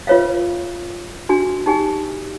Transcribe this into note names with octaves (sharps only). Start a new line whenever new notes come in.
F4 B4 C#5 E5 F5
D4 F#4 G#5
D#4 G4 G#5